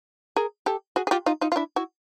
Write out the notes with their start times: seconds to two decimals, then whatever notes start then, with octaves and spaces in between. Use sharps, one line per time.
0.36 G#4 A#4
0.66 G4 A4
0.96 F#4 G#4
1.07 G#4
1.11 F4 G4
1.26 D#4 F4
1.41 D#4 F4
1.52 F4
1.56 D4 E4
1.76 E4 F#4